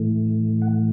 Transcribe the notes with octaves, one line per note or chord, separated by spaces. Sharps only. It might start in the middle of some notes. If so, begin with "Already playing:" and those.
Already playing: A2 E3 A3
F#5